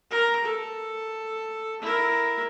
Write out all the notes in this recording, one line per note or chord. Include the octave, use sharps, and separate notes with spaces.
A#4 A#5
A4
E4 A#4